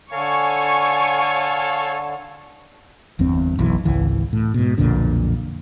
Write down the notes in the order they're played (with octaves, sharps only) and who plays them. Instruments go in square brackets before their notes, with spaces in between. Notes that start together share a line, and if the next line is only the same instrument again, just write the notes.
[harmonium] D3 [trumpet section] A4 C#5 F5 [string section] G#5 C#6
[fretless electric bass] G1 E2 G2 C4
F#1 B1 E3
G#1 C#2 E3
A2
G#2 B2
B1 F2 A#2 D3